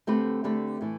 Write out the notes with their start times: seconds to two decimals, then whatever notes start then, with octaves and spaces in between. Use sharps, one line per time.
0.07 D3 A3 C4 G4 B4
0.44 D3 A3 C4 G4 B4
0.81 A2 E3